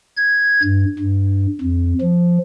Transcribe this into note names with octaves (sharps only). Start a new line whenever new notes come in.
G#6
G2
G2
F2
F3